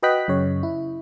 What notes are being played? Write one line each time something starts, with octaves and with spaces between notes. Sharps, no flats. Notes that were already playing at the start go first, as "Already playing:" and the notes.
F#4 B4 D#5 G5 F#6 B6
F#2 C#3 C#5
E4